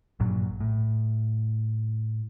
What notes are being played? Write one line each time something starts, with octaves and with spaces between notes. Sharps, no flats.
A#1 G2 A#2 F#3
A2